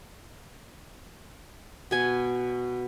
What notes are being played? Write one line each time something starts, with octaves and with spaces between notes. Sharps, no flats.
B2 G#5